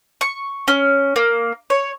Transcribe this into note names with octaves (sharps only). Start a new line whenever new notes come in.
C#6
C#4
A#3
C#5